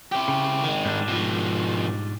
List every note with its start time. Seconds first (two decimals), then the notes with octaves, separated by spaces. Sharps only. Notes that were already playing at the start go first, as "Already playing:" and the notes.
0.12 E4 G4
0.28 C#3
0.63 D#3 G#3
0.85 G#2 G3 D4
1.08 B2 F3